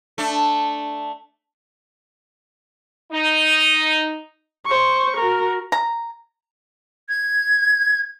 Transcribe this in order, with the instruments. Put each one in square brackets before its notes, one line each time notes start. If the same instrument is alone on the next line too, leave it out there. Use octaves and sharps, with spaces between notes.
[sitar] A3 D4
[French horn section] D#4
[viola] C5 C#6
F#4 A#4
[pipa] A#5
[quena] G#6